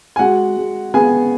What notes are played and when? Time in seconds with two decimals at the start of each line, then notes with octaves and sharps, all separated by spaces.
0.16 G#5
0.19 G#3 F#4 F#5
0.58 G#3
0.94 B3 G#4 G#5